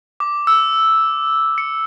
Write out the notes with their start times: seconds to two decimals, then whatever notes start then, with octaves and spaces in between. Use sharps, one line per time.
0.20 D6
0.47 E6
1.58 C#7